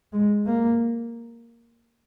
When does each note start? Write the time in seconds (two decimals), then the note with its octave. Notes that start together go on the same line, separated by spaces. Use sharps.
0.13 G#3
0.47 A#3